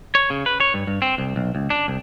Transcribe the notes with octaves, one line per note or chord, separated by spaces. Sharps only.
C#5
C#3
B4
C#5
G2
G2
C4
C2
B1
C#2
D4
C2